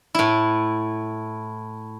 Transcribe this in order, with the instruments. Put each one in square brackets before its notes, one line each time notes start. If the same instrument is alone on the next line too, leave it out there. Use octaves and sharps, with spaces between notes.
[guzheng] A2 E4